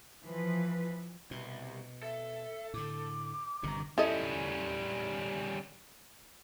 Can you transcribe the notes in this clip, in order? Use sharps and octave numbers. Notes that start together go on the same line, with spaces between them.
E3 F3 B4
C2 B2
A4 E5
A2 D3 D6
G1 G2 C3 D#3 A#5
G3 C#4 E4 A4 D#5